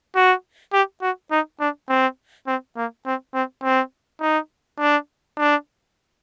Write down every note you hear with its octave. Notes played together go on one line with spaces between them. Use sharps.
F#4
G4
F#4
D#4
D4
C4
C4
A#3
C4
C4
C4
D#4
D4
D4